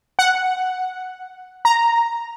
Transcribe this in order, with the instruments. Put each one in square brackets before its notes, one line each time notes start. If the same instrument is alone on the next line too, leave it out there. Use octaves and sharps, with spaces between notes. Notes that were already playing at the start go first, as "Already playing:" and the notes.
[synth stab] F#5
A#5